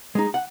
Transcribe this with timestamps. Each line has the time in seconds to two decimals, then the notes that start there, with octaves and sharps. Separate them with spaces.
0.15 G#3 D#4
0.34 F#5